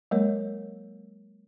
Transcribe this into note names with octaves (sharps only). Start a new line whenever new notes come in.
F#3 G#3 A#3 A#4 C#5